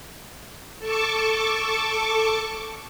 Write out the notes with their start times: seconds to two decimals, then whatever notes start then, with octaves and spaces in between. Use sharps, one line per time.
0.79 A4 A5 C#6 D6